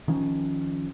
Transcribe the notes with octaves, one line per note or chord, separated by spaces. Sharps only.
D#3 F3 C#4